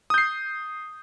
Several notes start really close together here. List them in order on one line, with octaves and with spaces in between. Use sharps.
D#6 G6 C7